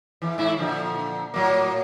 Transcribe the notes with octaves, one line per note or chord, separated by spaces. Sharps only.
E2 E3
G#2 E4
A#2 D3 F3
A2 F#3 A#3